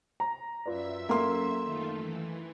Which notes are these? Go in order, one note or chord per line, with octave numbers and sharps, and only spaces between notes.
A#5
F#2 F4 B4 D5 E5 E6
A#3 A4 C6
D#3 A3 F4
E3